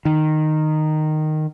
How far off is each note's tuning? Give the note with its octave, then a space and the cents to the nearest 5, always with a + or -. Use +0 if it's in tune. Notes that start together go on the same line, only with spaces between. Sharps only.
D#3 -10